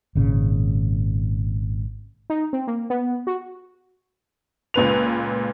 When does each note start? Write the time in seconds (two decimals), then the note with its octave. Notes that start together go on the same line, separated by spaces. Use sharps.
0.15 G#1 A#2 C#3
2.30 D#4
2.53 C4
2.67 A#3
2.90 B3
3.27 F#4
4.74 C#2 A#2 B4 F7